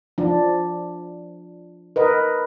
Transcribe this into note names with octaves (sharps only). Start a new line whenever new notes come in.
F3 D4
A#4 B4 D#5